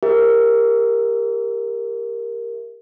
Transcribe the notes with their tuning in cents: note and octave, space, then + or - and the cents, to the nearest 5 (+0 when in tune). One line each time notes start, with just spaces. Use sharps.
G4 +25 A#4 +0 E5 +0